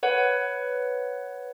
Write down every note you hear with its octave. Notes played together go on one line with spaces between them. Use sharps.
B4 C#5 F#5